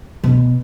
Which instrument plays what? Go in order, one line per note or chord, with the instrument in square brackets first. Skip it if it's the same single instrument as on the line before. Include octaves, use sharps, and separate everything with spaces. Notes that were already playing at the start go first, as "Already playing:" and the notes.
[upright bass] B2